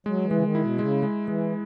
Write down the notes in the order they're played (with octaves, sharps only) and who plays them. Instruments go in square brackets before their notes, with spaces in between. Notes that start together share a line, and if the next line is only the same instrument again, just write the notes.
[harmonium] F#3 [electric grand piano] G#3
[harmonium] E3
[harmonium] C#3 [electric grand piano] G#3
[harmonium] D#3
[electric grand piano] E4
[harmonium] B2
[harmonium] C#3 [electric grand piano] G#3
[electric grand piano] G#3
[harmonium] E3 [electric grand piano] G#3